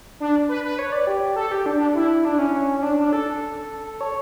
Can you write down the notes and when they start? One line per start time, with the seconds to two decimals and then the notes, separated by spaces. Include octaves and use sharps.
0.20 D4
0.49 B4
0.64 B4
0.79 C#5
0.92 D5
1.07 G4
1.36 A4
1.52 G4
1.66 D4
1.76 D4
1.95 E4
2.25 D4
2.39 C#4
2.78 C#4
2.82 D4
2.97 D4
3.13 A4
4.01 C#5